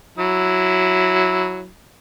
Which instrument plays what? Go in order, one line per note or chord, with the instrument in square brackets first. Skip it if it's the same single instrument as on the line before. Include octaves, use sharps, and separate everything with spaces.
[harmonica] F#3 E4